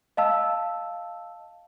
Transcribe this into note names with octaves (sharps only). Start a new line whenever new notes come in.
D#5 F5 A5 E6